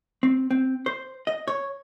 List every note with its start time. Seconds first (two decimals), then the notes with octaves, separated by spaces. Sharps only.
0.23 C4
0.51 C4
0.86 C5
1.27 D#5
1.48 C#5